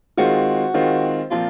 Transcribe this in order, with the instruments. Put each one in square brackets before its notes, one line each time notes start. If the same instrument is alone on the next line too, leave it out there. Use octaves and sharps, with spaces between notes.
[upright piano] D#3 G#3 C4 F4 [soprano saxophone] F#4
[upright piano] D#3 G#3 C4 F4
[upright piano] A#2 F3 C4 [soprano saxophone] F4